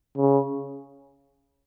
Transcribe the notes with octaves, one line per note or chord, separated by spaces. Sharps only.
C#3